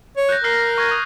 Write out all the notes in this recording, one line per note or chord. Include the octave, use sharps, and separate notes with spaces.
C#5
F#6 G6 A#6
A#4 F6 A#6 C7
C#6 G#6
D#6